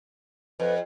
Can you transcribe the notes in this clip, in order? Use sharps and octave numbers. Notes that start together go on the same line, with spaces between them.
F2 B4